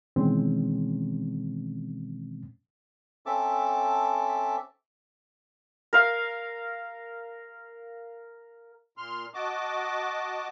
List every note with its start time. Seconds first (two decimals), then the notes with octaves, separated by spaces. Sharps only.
0.16 B2 D#3 E3 G#3 C4 C#4
3.26 C4 C#4 A4 E5 A5 D6
5.93 A#4 F5
8.98 A#2 C6 F6
9.34 F#4 D#5 A5 D6